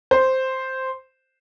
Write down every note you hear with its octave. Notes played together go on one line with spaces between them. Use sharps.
C5